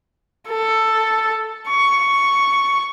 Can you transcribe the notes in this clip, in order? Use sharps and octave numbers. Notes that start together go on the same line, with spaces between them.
A4
C#6